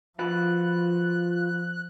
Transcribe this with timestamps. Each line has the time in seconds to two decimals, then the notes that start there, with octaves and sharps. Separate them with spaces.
0.19 F3 F4 F#4 B4 F#6